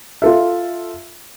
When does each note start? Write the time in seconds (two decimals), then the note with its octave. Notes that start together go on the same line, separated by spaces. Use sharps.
0.22 F4 A4 E5